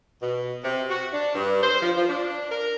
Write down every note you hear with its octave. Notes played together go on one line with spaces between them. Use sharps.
B2
C3
F#4
D4
G2
C5
F3
F3
D4
A#4